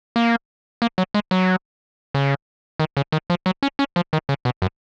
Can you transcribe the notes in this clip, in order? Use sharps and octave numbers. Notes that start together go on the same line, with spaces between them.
A#3
A#3
F#3
G#3
F#3
C#3
D#3
C#3
D#3
F3
F#3
C#4
C#4
F3
D#3
C#3
B2
F#2